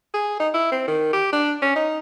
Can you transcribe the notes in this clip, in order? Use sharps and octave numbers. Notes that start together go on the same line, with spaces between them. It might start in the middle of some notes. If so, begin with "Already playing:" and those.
G#4
D#4
E4
C4
D#3
G4
D4
C#4
D#4